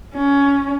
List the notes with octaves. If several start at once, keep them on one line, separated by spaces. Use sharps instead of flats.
C#4